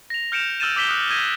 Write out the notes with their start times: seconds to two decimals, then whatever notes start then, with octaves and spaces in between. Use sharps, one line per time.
0.10 A#6 F7
0.32 F6 G6 C#7 D7 E7 F7
0.60 E6 F6 G6 A6 D#7 E7
0.76 D6 E6 G6 B6 E7 G7
0.89 D#6 F#6
1.10 D#6 G6 G#6 A#6 D#7